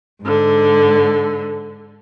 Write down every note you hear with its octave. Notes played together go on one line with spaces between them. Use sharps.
G#2 D3